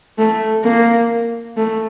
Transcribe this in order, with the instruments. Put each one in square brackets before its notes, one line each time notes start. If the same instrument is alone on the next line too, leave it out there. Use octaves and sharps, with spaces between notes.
[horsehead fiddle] A3
A#3
A3